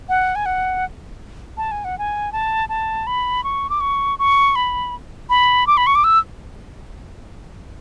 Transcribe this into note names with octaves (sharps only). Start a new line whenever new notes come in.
F#5
G#5
F#5
A5
G#5
F#5
G#5
A5
A5
B5
C#6
D6
C#6
C#6
B5
B5
D6
B5
C#6
D6
E6